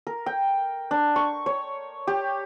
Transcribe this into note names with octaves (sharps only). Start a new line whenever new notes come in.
A#4
G5
D4
C#6
C#5
G4